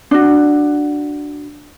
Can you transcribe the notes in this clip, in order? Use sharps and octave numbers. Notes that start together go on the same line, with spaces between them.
D4 F#4